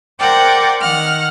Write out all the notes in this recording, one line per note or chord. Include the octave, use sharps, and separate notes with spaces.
A#4 C5 D5 F#5 G5
D#3 F#5 F6